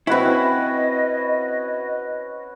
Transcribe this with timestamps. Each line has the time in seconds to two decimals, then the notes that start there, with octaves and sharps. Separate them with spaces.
0.07 C4 C#4 E4 F#4 B4 D#5